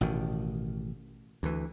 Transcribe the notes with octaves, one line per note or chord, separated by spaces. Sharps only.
A1 B2 D#3
D2 E3